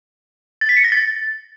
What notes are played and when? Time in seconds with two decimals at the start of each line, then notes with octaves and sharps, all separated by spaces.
0.61 A6
0.69 B6
0.77 C#7
0.84 A#6
0.92 A6